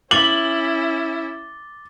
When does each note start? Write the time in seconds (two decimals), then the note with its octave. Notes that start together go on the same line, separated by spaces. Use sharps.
0.11 C#4 E4 D6 A6 F#7 G7